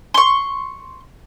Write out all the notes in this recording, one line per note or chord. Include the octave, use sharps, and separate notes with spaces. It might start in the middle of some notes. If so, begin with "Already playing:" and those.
C6 C#6